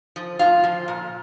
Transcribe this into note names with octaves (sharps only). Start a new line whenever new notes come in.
F3
A2 F4
F3
A#2